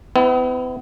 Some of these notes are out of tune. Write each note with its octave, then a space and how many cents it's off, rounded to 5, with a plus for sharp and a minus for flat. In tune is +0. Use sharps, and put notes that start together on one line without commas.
B3 +40 E4 -5